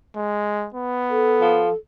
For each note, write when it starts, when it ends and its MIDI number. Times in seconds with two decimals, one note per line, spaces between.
0.16 0.67 56
0.74 1.66 59
1.10 1.75 69
1.41 1.70 53